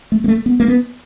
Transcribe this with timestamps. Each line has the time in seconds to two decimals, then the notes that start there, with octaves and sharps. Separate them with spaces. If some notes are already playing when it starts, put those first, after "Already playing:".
0.12 A3
0.24 A#3
0.28 A3
0.46 B3
0.60 A#3
0.68 B3